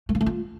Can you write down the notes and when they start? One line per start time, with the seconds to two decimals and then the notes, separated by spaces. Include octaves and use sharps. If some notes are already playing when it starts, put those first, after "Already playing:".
0.09 A3
0.15 A#3
0.21 A3
0.26 F4